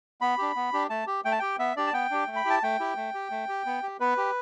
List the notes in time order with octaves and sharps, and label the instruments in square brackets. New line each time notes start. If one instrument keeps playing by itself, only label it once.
[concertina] B3 B5
D4 G4
B3
D4 G4
A3 A5
G4
A3 G5
A5
G4 G5
B3 E5
D4 G4 D5
A5
B3 G5
D4 G4
A3
B5
E4 G4 A5
A3 G5
E4 G4
A3
G4
A3
G4
B3
G4
B3 B4
G4